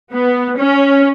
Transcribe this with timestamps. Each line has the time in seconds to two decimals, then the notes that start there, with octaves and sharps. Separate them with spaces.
0.12 B3
0.58 C#4